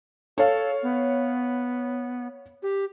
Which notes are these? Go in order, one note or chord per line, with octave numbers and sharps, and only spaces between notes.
A4 C#5 F5
B3
G4